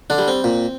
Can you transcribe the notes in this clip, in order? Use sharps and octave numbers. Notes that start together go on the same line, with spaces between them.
D3 D4
G3
C4
A#2